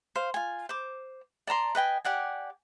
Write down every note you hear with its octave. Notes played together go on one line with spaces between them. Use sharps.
C5 F5
F4 G#5
C5 D6
D5 A5 A#5 C6
B4 D#5 G5 G#5
G4 D5 F#5 G#5